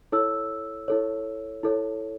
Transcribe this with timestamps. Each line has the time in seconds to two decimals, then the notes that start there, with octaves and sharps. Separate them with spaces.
0.12 E4 A4 C#5 E6
0.88 E4 A4 C#5
1.63 E4 A4 C#5